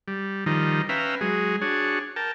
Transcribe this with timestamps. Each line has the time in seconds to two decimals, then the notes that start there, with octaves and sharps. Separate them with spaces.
0.08 G3
0.46 D#3 F3 G3 D#4
0.89 C#4 B4 E5 F5 G5 A#5
1.21 F#3 G#3 G#4
1.62 D4 F#4 G#4 C#5
2.16 A#4 G5 A5